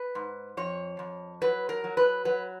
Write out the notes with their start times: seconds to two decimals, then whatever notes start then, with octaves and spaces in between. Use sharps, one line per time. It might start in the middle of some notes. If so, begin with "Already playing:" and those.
Already playing: B4
0.15 G#2
0.57 F2 C#5
0.99 F2
1.41 F#3 B4
1.69 A#4
1.84 F#3
1.97 B4
2.25 F#3 B4